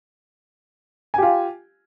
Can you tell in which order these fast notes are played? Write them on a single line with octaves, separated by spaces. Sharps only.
G#5 G4 F4